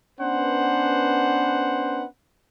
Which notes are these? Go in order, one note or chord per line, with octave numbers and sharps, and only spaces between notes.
B3 C#4 D4 B4 C5 F#5